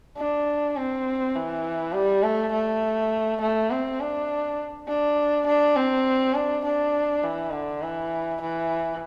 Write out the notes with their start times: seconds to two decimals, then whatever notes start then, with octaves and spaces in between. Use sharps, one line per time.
0.17 D4
0.77 C4
1.35 E3
1.93 G3
2.23 A3
2.52 A3
3.41 A3
3.70 C4
4.00 D4
4.88 D4
5.46 D4
5.76 C4
6.34 D4
6.65 D4
7.23 E3
7.52 D3
7.82 E3
8.41 E3